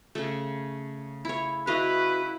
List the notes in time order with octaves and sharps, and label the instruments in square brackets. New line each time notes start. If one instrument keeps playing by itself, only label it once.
[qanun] C#3 A3
E4 C#5
[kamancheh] E4 [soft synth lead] F#4 [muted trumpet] B4 [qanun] D#5 F5